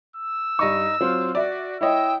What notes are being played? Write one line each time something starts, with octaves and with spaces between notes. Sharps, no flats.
E6
G2 D#4 C#6
F#3 C4 F4
F#4 D5 E5
E4 C#5 D#5 G5 E6